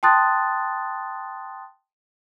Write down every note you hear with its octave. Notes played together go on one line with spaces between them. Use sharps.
G5 A5 C6 D#6 F#6 A6